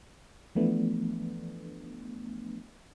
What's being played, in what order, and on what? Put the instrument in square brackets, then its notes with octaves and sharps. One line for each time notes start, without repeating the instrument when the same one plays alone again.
[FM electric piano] E3 F3 A3 B3 D4